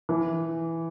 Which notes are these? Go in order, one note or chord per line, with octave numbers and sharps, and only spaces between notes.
E3